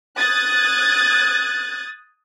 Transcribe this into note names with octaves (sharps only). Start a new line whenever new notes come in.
D#6 F#6 G#6 A6